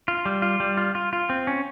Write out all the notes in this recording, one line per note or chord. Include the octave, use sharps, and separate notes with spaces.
F4
G3
F4
G3
F4
F4
F4
C4
C#4